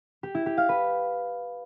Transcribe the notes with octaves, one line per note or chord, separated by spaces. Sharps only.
G4
E4
G4
F5
B4